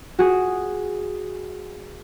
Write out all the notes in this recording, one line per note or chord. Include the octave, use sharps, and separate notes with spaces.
F#4 G#4